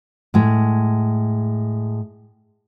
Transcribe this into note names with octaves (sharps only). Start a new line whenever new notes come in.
A2 G#3